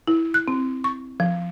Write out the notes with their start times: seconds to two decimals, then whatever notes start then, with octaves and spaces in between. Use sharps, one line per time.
0.07 E4
0.34 F#6
0.48 C4
0.84 C#6
1.20 F3